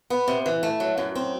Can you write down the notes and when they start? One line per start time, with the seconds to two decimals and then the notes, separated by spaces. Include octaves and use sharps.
0.10 B3
0.28 C3
0.46 E3
0.63 A3
0.80 F#3
0.98 F#2
1.15 C4